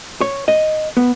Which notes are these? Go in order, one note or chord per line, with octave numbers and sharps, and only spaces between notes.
C#5
D#5
B3